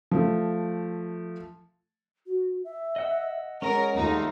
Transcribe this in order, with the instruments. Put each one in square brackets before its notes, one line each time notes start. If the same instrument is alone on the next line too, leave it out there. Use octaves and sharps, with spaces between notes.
[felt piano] F3 A3
[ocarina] F#4
E5
[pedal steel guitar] D#5 F#5 E6
[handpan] G#3 [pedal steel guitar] C#4 G#4 C#5 [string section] A#4 [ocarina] F#5
[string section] D#2 D#4 [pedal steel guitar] G3 [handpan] A3 F4